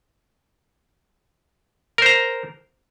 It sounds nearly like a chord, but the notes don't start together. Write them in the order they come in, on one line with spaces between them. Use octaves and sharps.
A#4 C5 A#5